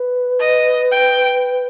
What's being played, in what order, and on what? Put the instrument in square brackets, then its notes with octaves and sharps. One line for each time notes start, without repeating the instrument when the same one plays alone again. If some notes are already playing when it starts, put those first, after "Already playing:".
Already playing: [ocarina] B4
[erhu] D#5
G5